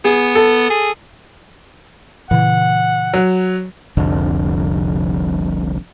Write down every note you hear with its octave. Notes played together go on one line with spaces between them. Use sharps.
B3 G#4
A4
G#4
A#2 C#3 E3 F#5
F#3
F1 C2 F2 D3